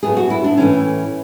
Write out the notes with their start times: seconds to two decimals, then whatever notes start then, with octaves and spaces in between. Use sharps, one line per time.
0.03 A2 F#3 B3 G#4
0.17 F#4
0.30 E4
0.44 D4
0.57 A2 E3 A3 C#4